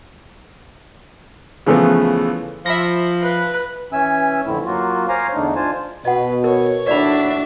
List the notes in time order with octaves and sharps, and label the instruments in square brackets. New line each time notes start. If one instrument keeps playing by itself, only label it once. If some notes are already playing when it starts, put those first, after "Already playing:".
[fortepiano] C#3 E3 F3 A3 B3
[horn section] F3 [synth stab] E5 B5 A#6
[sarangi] B4
[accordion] E3 C#4 E5 G#5 E6
F2 A2 D3 A3 C4 E4
F#3 A#3 F4 F#4
C5 C#5 F5 G#5 A#5 D6
E2 D3 A3 D4 D#4
D4 F4 C5 G#5 A5
[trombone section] B2 [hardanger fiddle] B4 [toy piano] D#5 F#5
[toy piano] A#4 [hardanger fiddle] C#5
[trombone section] D#2 A2 F#4 [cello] D4 [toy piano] D5 B5 [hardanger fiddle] E5